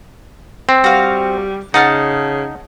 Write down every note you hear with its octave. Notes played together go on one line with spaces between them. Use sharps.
C4
G3 F#4 F5
C#3 D#4 F#5 A5 F6